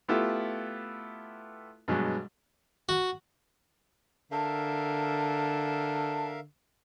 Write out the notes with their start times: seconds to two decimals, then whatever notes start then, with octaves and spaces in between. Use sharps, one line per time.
0.08 A3 B3 E4 F4 G4 A4
1.88 G2 B2 F#3 G#3
2.89 F#4
4.31 D3 A#4 E5 F5 A5